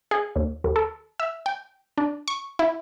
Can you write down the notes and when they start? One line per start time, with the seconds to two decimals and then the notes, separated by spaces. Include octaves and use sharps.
0.11 G#4
0.36 D#2
0.64 D#2
0.76 A4
1.20 E5
1.46 G5
1.98 D4
2.28 C#6
2.59 E4